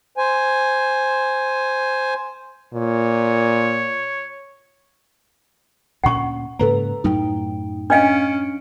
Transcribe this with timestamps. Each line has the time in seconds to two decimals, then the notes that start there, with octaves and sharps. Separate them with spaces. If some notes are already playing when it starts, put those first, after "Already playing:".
0.18 C5 G#5
2.74 A#2 C#5
6.04 D2 A#2 C#4 F#5 C#6
6.59 G#2 C#3 A#3 A4 B4 A#5
7.04 F#2 A2 F#3 D#4 G5
7.90 C#4 D4 D#5 F5 F6 C#7 D7